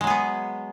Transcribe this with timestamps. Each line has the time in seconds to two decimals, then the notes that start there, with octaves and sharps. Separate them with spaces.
0.01 G#3
0.04 F#3
0.07 G#4
0.10 B3